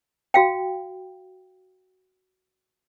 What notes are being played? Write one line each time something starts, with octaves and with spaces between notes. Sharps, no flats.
F#4 F5 G5